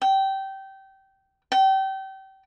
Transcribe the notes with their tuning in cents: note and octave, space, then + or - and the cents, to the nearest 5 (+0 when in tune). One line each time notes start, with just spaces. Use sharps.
G5 -20
G5 -30